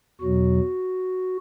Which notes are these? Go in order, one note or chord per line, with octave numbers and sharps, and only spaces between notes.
E2 B2 F#3 F#4